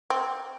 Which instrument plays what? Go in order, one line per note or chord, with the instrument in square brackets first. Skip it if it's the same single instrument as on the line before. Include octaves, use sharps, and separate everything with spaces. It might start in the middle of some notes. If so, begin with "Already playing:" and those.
[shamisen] C4